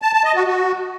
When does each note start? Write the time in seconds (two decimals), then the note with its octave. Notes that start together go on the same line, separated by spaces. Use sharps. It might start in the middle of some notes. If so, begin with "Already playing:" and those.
0.02 A5
0.13 A5
0.24 D#5
0.35 F#4
0.47 F#4